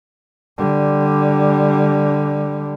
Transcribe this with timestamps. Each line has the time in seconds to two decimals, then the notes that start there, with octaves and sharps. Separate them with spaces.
0.58 D3 G3